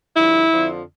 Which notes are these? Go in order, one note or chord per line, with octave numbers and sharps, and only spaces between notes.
G2 D3 F3 E4
F2 D3 F3